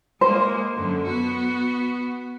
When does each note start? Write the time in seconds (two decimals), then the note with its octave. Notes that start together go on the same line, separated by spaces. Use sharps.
0.21 G#3 A#3 C5
0.76 F#2 D3
1.07 B3 F#4